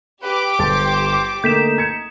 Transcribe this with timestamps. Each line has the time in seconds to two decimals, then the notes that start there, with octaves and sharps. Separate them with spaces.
0.22 G4 B4 D6
0.59 G1 C5 A5 A6
1.44 D3 A3 A#3 D#4 G6 B6 E7
1.78 G#6 C#7